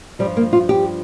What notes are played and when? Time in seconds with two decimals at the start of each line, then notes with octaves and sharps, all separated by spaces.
0.19 F3 G3
0.24 G2
0.37 A#3
0.53 F4
0.69 G4